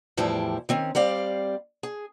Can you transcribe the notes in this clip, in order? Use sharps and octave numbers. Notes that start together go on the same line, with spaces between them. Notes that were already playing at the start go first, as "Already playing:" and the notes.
E2 A2 F3 G3 E4 G4
D#3 C4 C#4
G3 C4 D5 F5
G#4